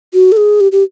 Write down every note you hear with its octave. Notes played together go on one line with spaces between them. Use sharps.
F#4
A4
G#4
G4
G4